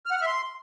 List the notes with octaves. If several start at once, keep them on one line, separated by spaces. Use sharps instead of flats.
F6
F#5
F6
E5
C6